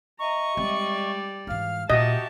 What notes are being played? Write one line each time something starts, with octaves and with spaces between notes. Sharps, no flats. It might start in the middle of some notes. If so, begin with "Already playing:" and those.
D#5 E5 A#5 C#6
G3 G#3 C4 D5
G#2 E3 F5 F6
A#2 F#4 G4 D#5 E5 A5